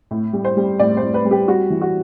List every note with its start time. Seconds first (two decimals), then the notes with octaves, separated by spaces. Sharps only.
0.11 A2
0.33 G3
0.45 C5
0.57 G3
0.79 A2 D5
0.97 C5
1.02 A2
1.14 B4
1.25 G3
1.31 G4
1.48 G3 F#4
1.70 E3
1.81 F#4